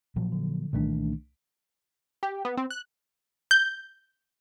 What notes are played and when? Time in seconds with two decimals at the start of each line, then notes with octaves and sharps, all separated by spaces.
0.16 A#2 F3 F#3
0.32 D3
0.73 C2 A#2 D#3 E3 A3 D4
2.23 G4
2.45 B3
2.57 C4
2.70 F#6
3.51 G6